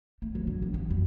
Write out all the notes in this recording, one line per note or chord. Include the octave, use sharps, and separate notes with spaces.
A3
F#3
D3
E3
C#3
F#2